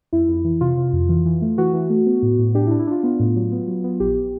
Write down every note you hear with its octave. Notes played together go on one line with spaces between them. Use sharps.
F2 E4
F2
E3
C3 F4
C3
F2
E3
E3
A3
E3 F#4
E3
A3
B3
A2
A2
D4 G4
E4
D4
E4
D4 F4
B3
A2
F#3
B3
F#3
B3
A#1 G4